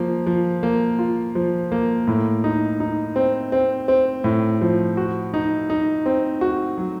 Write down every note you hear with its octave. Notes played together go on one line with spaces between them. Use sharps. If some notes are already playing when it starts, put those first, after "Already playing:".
Already playing: F3 A#3
F3
A#3
F4
F3
A#3
A2
D#4
D#4
C4
C4
C4
A2
F3
F#4
D#4
D#4
C4
F#4
F#3